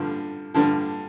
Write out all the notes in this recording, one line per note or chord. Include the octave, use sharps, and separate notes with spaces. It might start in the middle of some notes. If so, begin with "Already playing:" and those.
Already playing: G2 D3 F3
G2 D3 F3